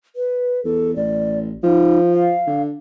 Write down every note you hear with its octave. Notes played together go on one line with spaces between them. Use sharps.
B4
E2 A4
A1 D5
F3 D#4
F5
D3